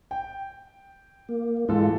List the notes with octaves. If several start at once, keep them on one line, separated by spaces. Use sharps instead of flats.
G5
A#3
G#2 E3 G#3 F4 A4